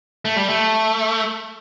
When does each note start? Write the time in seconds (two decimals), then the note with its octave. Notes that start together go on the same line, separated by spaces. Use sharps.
0.25 A3
0.36 G3
0.48 A3